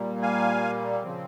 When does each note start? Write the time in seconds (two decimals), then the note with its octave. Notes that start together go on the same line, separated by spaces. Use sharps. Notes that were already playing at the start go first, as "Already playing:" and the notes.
Already playing: A#2 G3 A#3
0.22 F5 G#5
1.03 C#3 F3 C4